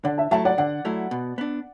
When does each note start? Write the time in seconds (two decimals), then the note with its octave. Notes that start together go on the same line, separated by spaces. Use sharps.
0.04 D3 D5 F#5
0.18 E5 A5
0.31 F#3 A3 E4 E5 A5
0.45 D5 F#5
0.58 D3 D5 F#5
0.85 F#3 A3 E4
1.11 B2
1.38 B3 D4